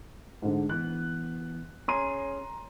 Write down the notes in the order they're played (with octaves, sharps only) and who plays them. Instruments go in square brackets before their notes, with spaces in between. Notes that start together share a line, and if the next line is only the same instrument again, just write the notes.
[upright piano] G#2 D3
[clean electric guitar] E3 B3 [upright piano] F#6
[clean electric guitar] C#4 G#4 [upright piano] A#5 C6 D#7